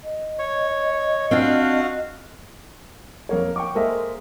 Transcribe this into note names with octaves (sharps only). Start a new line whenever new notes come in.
D#5
C#5
C4 D4 F4 F#4 F5
F2 A#3 C#5
G5 C#6 D6
G#3 A#3 A4 C5 D#5 E5